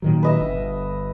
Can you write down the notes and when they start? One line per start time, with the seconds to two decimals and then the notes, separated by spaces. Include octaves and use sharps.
0.02 A#2 D#3 F#3
0.23 B4 D#5 E5
0.40 G1 G2